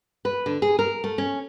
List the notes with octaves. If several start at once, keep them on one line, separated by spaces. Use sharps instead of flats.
B4
D3
G#4
A#4
A3
C#4